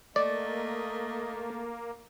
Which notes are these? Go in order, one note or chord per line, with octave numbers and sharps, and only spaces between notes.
A3 A#3 D5 D#5